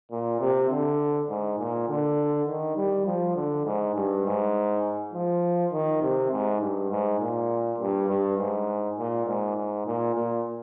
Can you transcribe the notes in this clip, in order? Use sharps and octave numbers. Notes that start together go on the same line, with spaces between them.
A#2
C3
D3
G#2
A#2
D3
D#3
G3
F3
D3
G#2
G2
G#2
F3
D#3
C3
G#2
G2
G#2
A#2
G2
G2
G#2
A#2
G#2
G#2
A#2
A#2